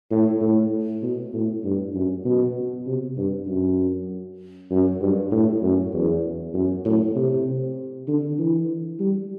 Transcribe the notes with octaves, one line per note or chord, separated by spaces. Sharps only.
A2
A2
B2
A2
G2
F#2
B2
C3
G2
F#2
F#2
G2
A2
F#2
E2
F#2
A2
C3
D3
E3
G3